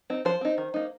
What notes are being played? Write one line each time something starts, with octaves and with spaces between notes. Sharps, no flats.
C4 D#4
F3 C5
C4 D#4
D#3
A#3 D#4